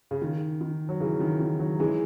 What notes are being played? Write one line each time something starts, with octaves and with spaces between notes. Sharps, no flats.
C#3
D#3
D#3
F#3
C#3 E3
D#3
D#3
D#3 F#3
E3 G#3